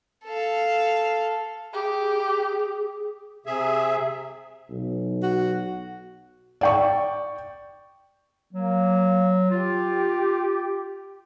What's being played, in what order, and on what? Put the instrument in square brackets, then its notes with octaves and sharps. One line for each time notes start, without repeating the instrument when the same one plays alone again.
[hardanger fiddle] A4 F5
[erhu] G4 [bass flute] G#4
[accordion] C3 G#4 E5
[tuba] B1
[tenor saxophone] F#4
[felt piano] D5 G5 C#6
[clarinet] F#3 [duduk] A#3
[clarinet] F4 [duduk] G4